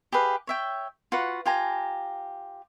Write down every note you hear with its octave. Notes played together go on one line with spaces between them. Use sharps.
G4 G#4 B4 F5
C#5 E5 G5
F4 F#4 B4 F#5
F4 G4 G#5 A#5